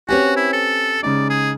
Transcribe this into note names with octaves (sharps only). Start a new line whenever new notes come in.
C4 C#4 F#4 G4 B4 C#5 G#5
E4
A4
C#3 G#3 D#4 D5
G#4